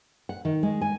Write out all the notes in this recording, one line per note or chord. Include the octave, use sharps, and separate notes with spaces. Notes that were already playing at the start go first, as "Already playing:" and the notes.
F#5
D#3
G#3
G#5